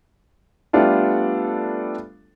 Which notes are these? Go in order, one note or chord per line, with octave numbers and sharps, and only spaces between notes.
G3 A3 B3 D4 F4 A4